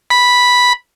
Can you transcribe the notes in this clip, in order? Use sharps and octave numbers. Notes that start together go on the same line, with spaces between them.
B5